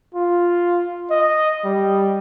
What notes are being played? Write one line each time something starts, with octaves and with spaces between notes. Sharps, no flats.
F4
D#5
G3